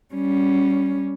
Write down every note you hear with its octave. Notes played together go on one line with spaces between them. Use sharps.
G3 C#4